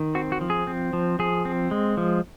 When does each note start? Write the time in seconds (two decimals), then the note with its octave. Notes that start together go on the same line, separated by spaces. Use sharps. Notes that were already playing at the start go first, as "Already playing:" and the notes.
Already playing: D#3
0.15 C4 F#4
0.32 F#4
0.41 F3
0.50 G#4
0.67 C4
0.93 F3
1.19 F3 G#4
1.45 C4
1.71 G#3
1.97 F3